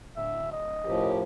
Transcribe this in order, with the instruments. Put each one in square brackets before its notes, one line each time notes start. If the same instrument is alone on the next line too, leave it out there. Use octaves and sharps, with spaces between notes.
[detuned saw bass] D1 [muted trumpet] E5
[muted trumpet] D#5
[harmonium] A2 F3 [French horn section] C#4 G4 A#4